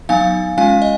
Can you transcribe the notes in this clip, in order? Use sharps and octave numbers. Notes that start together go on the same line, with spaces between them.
F#3 B3 D#4 F5 G#5
G#3 C#4 F4 F5 G#5
D#5